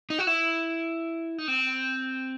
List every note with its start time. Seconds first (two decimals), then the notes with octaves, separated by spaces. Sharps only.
0.10 D#4
0.19 F#4
0.27 E4
1.38 D#4
1.48 C4